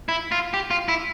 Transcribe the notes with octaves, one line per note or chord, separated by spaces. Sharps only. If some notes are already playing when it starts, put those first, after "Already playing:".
E4
F4
G4
F4
E4